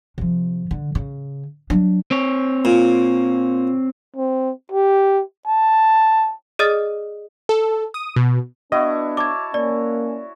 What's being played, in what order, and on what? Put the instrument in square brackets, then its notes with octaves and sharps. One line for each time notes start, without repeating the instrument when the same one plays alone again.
[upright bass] C3 F3
D3
C#3
F#3 D4
[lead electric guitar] C4 C#5
[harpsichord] A#2
[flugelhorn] C4
G4
A5
[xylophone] G#4 D5 D#5 D#6 F6 A6
[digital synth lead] A4
D#6
B2
[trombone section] B3 D4 [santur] E4 F#4 [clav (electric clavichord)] D#5
[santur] C#5 A5 [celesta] D6 G#6
[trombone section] A#3 C#4 [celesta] D5